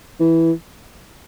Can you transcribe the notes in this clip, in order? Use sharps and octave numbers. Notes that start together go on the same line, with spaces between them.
E3